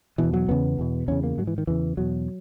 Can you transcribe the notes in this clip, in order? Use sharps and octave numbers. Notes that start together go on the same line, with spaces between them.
E2 B2 E3
F#3
E2 C#3 B3
E2 B2
E2 C#3 C#4
A#3
G#2 F#3
E3
D#3
E2 C#3 E3
E2 B2 F#3